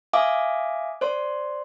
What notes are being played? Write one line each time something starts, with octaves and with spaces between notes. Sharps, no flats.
E5 F5 G#5 D6 D#6
C5 D5 C6